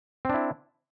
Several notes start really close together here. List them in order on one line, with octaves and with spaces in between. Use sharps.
C4 D4 E4